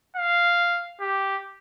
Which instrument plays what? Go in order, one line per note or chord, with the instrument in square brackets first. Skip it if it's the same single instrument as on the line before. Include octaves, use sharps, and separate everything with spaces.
[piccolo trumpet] F5
G4